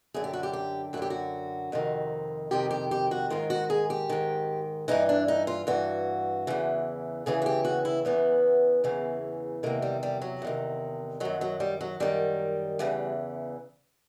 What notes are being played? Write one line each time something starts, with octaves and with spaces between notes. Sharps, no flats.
F#2 D3 G#4
G4
F#4
G4
G4
F#2 D3 F#4 G4
F#4
F2 C3 D#3
F2 C3 D#3 G4
G4
G4
F#4
G#2 D#3 F4
F#4
G#4
G4
G#2 D#3
G2 E3 D#4
D4
D#4
F4
G2 E3 F#4
E2 C#3 E3
E2 C#3 E3 G#4
F#4
G4
F#4
E4
E2 C#3 E3 B3
E2 C#3 E3
E2 C3 D#3 A#3
G3
G3
F#3
E2 C3 D#3
F#2 D#3 F#3
F#3
G3
F#3
F#2 D#3 G3
E2 C#3 E3